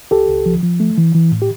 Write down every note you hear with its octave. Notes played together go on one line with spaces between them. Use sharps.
C#2 G4 A4
C#2
F3
F3
A3
E3
E3
A2
G4